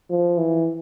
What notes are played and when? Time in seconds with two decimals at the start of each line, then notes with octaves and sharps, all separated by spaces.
0.10 F3
0.38 E3